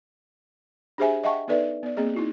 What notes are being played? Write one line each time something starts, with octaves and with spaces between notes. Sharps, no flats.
D4 G4 G#4 C5 E5 G#5
D#5 E5 F#5 G5 A5 C#6
B3 D#4 A4 B4 D5 E5
B3 D5
A#3 C4 G#4 D#5
D#4 E4 F#4